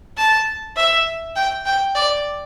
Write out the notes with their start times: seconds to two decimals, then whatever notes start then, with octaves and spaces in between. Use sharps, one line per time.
0.17 A5
0.76 E5
1.36 G5
1.65 G5
1.95 D5